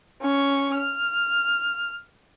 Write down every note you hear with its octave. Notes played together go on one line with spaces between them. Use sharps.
C#4 C#6
F6